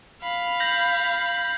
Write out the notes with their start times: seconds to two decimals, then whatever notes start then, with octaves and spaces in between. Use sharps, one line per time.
0.22 F5 B5
0.60 G6 A#6 F#7